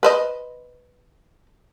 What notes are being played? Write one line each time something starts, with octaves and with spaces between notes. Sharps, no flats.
B4 C5 D#5